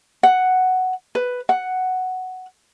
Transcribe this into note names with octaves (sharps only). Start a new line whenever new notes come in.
F#5
B4
F#5